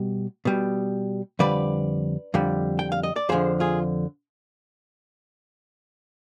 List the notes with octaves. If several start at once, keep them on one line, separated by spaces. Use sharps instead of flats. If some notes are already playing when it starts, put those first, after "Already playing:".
Already playing: B2 G3
B2 G3
F2 D3 G3 B4 D5
F2 D3 G3
G5
F5
D#5
D5
F2 D3 F3 G#4 C5
F4 G#4